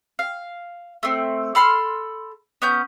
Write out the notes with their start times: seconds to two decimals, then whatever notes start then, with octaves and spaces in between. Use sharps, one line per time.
0.19 F5
1.03 A3 C4
1.55 A4 B5 C6 F6
2.62 B3 C#4 G6